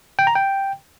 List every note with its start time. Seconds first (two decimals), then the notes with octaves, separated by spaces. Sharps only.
0.19 G5
0.27 A#5
0.35 G5